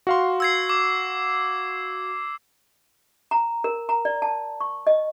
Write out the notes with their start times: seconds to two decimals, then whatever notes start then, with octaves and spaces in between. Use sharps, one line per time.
0.07 F#4 F5 C6
0.40 E6 G#6 C7
0.69 D6
3.31 A#5
3.64 A#4
3.89 A#5
4.05 D5
4.22 A5
4.61 C#6
4.87 D#5